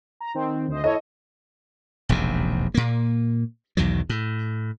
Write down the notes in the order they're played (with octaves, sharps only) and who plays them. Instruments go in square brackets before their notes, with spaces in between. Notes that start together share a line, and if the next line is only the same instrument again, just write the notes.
[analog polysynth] A#5
D#3 C4
D2 C5 D#5
[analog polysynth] E4 A4 C#5 [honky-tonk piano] D#5
[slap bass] E1 A#1 D#2 C3
A#2 A#3
B1 E2 D#3 F#3
A2